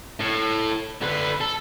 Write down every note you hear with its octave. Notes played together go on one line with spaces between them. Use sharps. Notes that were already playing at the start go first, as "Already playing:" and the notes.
A2
D3 B4
A4